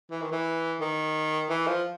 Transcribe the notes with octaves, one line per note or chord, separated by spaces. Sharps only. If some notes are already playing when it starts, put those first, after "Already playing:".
E3
D#3
E3
D#3
E3
F3